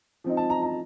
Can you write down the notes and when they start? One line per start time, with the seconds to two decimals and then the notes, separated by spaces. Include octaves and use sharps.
0.24 F3 C4 D#4
0.37 A5
0.50 A#5
0.63 A#5